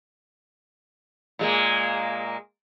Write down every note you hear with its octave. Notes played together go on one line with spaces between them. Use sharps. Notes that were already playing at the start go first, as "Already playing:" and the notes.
A#2 G#3 A#3